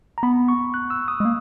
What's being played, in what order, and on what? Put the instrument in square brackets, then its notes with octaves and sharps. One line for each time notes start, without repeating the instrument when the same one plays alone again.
[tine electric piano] A#5
[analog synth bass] B3 [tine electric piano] B5
[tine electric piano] C#6
F#6
E6
D#6
[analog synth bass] G#3
A#3